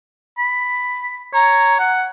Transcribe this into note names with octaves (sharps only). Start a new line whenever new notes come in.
B5
C#5 A#5
F#5